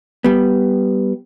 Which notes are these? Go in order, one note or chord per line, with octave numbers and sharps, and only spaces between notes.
G3 B3